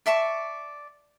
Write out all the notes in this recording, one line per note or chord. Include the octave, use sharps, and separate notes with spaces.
D5 E5 A5 C#6